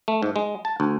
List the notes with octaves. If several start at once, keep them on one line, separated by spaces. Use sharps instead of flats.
A3
G#2
G#3
A5
D2